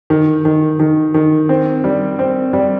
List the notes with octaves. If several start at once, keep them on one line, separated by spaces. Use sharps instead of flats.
D#3
D#3
D#3
D#3
C4
G3
C4
G3